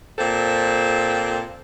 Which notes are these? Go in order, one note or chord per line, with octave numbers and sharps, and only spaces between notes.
A#2 C4 F4 A4